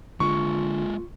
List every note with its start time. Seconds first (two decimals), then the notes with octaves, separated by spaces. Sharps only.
0.20 D3 G#3 A#3 F4 C#6